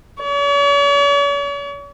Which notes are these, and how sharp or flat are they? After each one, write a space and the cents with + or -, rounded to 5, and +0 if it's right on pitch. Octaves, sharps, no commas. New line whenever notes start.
C#5 +45